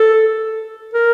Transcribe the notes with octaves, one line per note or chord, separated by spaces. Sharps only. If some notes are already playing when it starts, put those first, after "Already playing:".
Already playing: A4
A#4